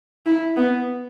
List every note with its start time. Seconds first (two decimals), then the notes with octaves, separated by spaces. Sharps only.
0.26 E4
0.56 B3